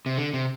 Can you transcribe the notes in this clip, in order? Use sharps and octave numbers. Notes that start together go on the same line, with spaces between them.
C3
D3
C3